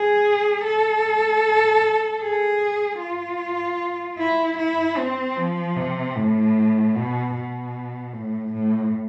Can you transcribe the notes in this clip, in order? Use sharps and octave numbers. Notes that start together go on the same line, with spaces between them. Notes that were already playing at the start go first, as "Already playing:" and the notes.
Already playing: G#4
A4
G#4
F4
E4
E4
C4
F3
C3
A2
B2
B2
A2
A2